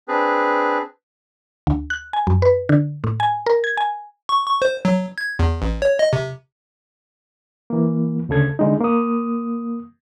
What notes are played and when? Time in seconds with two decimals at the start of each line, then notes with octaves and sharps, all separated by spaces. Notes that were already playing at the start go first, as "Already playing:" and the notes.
0.08 C4 D4 G#4 B4
1.67 D2
1.90 F#6
2.13 G#5
2.27 F#2
2.42 B4
2.69 D3
3.04 A2
3.20 G#5
3.46 A#4
3.64 G#6
3.77 G#5
4.29 C#6
4.46 C#6
4.62 C5
4.85 F#3
5.18 G#6
5.39 E2
5.62 A1
5.82 C#5
5.99 D#5
6.13 C3
7.70 E3 A#3
8.29 D2 C#3 A4 G#6
8.59 D3 G#3 D#4
8.81 A#3 D#6